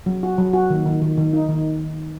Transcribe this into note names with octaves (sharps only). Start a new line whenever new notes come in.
F#3
F#4
F#3
F#4
D#3
D#3
D#3
D#3
D#4
D#3